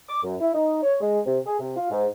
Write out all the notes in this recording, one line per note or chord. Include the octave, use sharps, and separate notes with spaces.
D6
F#2
E4
D#4
C#5
G#3
C3
G#4
C3
F4
G#2